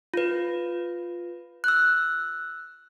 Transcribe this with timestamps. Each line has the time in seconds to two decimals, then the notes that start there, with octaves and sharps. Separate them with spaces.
0.14 F4 B4
1.64 E6 F#6